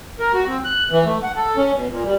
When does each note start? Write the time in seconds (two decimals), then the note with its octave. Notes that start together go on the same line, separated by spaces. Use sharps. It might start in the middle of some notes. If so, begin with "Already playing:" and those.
0.19 A#4
0.34 F#4
0.47 C4
0.65 F#6
0.91 E3
1.05 A3
1.23 F#5
1.36 A4
1.57 C#4
1.75 B2
1.91 A#2
2.05 G3